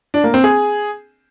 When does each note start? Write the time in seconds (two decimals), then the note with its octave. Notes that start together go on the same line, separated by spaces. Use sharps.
0.14 D4
0.24 A#3
0.34 C4
0.44 G#4